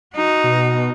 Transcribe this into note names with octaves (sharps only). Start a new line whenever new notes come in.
D#4 F#4
B2